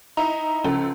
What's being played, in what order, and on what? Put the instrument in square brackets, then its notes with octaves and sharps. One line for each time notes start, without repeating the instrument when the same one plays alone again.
[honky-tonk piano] D#4 E4 [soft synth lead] A#5
[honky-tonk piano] C#2 F3 A4 [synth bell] C#4